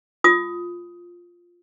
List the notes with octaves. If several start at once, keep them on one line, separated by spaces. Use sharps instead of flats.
F4 D#6